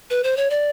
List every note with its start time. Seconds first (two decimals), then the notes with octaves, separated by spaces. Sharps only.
0.10 B4
0.24 C5
0.37 C#5
0.50 D5